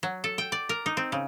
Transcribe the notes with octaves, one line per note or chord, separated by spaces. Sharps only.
F#3
A4
G5
D5
A#4
D#4
C4
C#3